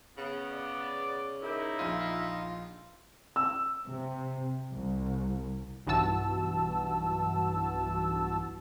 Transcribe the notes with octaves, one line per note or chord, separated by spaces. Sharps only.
C#3 B3
D5
D#4 E4 A#4 D6 G6
A#1 F4 D#7
E6
C3
C2
B1 G2 E3 F#4 A5 E6